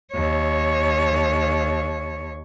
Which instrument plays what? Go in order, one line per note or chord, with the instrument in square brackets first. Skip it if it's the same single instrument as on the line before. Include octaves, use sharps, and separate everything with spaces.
[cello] D#2 C#5